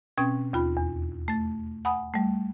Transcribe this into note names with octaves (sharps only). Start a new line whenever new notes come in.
B2 C4 C#4 G5 G#6
D#2 F4 B5
E2
A3 A6
F#5 G#5 B5 D#6
G3 A3